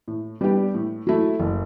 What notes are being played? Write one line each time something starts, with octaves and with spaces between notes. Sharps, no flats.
A2
G3 B3 D4 G4
A2
F#3 A3 E4
F#1